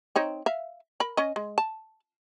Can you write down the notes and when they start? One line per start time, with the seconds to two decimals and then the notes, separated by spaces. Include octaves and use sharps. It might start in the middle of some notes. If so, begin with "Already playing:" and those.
0.16 C4 D#4 C#5
0.46 E5 F5
1.00 A#4 B5
1.17 C#4 D#5
1.36 G#3
1.58 A5